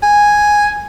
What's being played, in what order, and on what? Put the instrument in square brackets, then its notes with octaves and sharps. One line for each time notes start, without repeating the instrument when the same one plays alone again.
[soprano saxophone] G#5